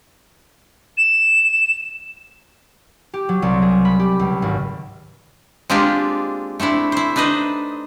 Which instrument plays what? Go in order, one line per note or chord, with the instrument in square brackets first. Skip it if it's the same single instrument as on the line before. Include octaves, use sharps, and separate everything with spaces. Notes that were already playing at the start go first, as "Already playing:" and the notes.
[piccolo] E7
[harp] G4
F#3
C2
G#4
B5
G4
C#2
G#1
[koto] G#3 A#3 C4 D4 F4 G4
A3 C4 D4 E4
E4 C5
D4 D#4 B4 C5 D#5